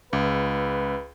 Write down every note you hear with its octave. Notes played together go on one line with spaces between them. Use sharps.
C#2 B4